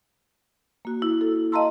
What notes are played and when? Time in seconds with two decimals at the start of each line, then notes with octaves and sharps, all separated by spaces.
0.85 A#3 F#4
1.02 E4
1.21 A4
1.52 D#5 F5 A5 A#5 C6 E6